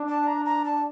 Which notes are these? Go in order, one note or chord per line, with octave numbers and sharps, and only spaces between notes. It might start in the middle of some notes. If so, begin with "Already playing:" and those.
Already playing: D4
A5
A#5
A#5
A5